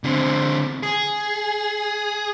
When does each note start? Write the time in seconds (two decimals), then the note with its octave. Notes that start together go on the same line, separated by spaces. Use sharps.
0.04 D3 C4
0.83 G#4